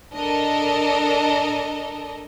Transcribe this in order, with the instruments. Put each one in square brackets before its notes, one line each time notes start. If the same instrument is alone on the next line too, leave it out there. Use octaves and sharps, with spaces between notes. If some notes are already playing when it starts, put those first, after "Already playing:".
[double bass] D4 [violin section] A4 A#4 D#5